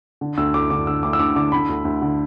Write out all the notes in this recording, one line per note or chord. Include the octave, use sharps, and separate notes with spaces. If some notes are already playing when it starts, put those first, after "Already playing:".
D3
D2 E6
D2 D6
D3 D6
D3 E6
D2 D6
E6
D2 D6
D3 D6
D3 B5
D2
D2
D3